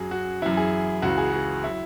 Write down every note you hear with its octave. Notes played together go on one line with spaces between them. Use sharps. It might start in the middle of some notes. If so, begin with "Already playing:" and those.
Already playing: F#2 F#3 G#4
F#4
F#2 E3 E4
G#4
C#2 C#3 E3 F#4
G#4
F#4
F#3 E4